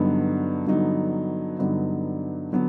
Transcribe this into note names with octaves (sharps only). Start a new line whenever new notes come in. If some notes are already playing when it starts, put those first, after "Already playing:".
Already playing: G2 D3 F#3 B3 D#4
G2 D3 F#3 B3 D#4
G2 D3 F#3 B3 D#4
D3 F#3 B3